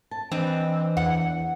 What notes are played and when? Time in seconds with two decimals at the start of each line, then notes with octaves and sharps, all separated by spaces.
0.11 A5
0.32 E3 C4 D4 D#5 B5
0.97 E2 F#5